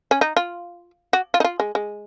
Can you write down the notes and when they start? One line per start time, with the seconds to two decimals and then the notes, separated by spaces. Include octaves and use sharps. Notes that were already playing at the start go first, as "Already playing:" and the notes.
0.11 C#4
0.21 D#4
0.37 F4
1.13 F#4
1.34 F4
1.40 D#4
1.44 F4
1.60 G#3
1.75 G#3